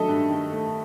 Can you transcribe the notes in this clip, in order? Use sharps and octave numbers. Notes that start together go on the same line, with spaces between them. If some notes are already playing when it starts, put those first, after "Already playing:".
Already playing: D#3 F#3 A3 A4 D#5 E5
G2
D#3
A3